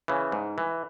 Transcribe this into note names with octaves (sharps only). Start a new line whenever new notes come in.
C#3 E3
G#2
E3